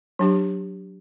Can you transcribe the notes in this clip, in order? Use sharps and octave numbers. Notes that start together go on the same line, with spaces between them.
F#3 D4 G4